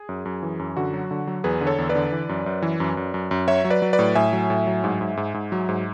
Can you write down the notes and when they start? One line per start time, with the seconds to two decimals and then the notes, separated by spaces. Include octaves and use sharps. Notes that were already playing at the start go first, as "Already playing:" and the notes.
Already playing: G#4
0.09 F#2
0.25 F#2
0.43 E3
0.59 F#2
0.76 D3 F#4
0.94 F#3
1.11 D3
1.27 F#3
1.44 E2 G#4 B4
1.61 D3
1.67 A4 C#5
1.78 E2
1.89 B4 D5
1.95 D3
2.12 E3
2.29 F#2
2.46 F#2
2.62 E3
2.80 F#2
2.97 F#2
3.14 F#2
3.31 F#2
3.48 F#3 C#5 E5
3.65 F#3
3.70 B4 D5
3.82 F#3
3.93 B4 D5
3.99 A2
4.15 A2 E5 G#5
4.33 F#3
4.50 A2
4.67 F#3
4.84 G#2
5.01 G#2
5.17 G#2
5.34 G#2
5.52 F#3
5.69 G#2